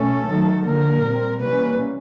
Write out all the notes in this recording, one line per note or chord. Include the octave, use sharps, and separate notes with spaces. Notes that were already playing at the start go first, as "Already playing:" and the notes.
Already playing: B2 A3 C#4 A4
D#3 F#3 A3
D3 F3 A#3 A#4
A#2 G3 C4
C3 E3 G3 A#3 C#4 B4